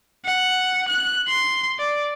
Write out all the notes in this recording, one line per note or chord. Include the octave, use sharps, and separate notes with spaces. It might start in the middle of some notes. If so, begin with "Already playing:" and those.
F#5
F#6
C6
D5